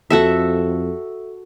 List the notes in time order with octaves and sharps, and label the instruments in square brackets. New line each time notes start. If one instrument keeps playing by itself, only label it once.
[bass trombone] F2 [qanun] F#4 A4 E5